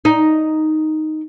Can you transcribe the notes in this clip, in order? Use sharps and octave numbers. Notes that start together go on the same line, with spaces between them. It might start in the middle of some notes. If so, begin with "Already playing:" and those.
D#4